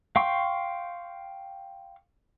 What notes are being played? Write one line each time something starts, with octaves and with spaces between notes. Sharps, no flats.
F5 G5 C6 C#6